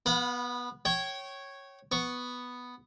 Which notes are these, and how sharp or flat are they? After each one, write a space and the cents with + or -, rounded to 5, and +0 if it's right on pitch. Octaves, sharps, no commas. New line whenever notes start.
B3 -15 F5 +45 B5 +0
C#5 -10 G5 -30
B3 +0 C#6 +0